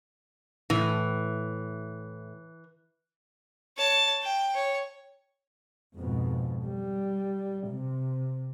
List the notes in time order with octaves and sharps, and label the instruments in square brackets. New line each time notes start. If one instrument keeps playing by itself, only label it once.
[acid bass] A2 [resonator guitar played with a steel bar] E3
[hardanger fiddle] C#5 A5
G5
C#5
[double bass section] F2 G#2 B2
G3
C3